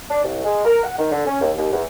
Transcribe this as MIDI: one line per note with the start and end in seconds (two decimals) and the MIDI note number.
0.11 0.24 62
0.25 0.43 36
0.45 0.65 56
0.65 0.81 70
0.83 0.97 78
0.98 1.09 51
1.11 1.26 50
1.27 1.41 61
1.42 1.52 39
1.57 1.72 39
1.73 1.83 40